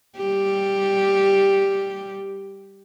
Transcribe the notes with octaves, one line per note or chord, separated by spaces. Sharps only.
G3 G4